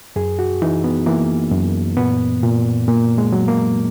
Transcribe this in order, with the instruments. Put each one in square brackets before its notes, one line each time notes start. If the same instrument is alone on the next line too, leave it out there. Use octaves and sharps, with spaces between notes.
[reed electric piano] F#2 G#4
F#4
E3 D#4
B3
E3 A#3
F#2
A#2 B3
A#2
A#2 A#3
G#3
F#3
A#3